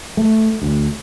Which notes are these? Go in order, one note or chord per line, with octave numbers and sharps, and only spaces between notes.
A3
D2